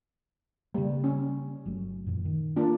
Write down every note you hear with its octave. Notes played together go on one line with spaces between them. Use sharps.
C#3 G3 A#3
C#4
G1 F#3 A3
F#2 A#2 E3
D#3
A#3 D4 F4